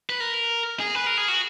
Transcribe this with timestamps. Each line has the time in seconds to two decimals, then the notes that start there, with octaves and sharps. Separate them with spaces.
0.10 B4
0.20 A#4
0.80 G#4
0.95 B4
1.07 A#4
1.17 G#4
1.28 F#4